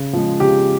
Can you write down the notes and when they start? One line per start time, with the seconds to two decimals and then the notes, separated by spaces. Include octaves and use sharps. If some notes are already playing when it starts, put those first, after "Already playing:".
Already playing: C#3
0.13 F3 G#3
0.40 C#3 G4